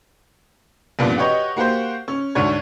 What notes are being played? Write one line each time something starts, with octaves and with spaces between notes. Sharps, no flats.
A1 G2 A#2 F3 B3
F#4 G4 B4 C#5 D#5
A#3 F#4 G4 C5
C#4
D2 G#2 D4 F#4 C#5 G#6